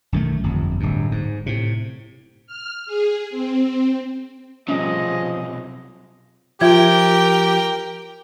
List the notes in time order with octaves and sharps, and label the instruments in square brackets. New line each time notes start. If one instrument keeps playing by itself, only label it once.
[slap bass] B1 F#2 D#3 A3
G1 F2
D1 G2
G#2
A2 C3
[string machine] F6
G#4
C4
[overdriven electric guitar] B1 C3 [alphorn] F3 [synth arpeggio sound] G3 A3 C#4 [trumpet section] G#4 D#5
[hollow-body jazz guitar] F3 [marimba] F4 E5 G#6 [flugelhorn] G4 [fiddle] A#4 G5